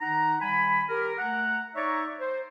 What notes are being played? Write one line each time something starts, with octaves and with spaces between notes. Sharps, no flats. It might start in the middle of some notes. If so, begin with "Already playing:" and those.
D#3 D#4 F#5 A#5
D#3 G3 G#5 B5
G4 A#4
A3 F#5 A#5
D#4 C#5 D5 E5 A#5 C#6
C5